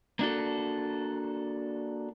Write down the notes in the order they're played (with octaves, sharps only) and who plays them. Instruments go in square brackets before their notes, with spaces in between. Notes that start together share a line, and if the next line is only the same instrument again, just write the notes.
[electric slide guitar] A#3 D4 F#4 A4